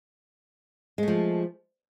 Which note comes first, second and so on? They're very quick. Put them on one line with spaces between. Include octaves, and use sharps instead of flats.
G#3 A3 F3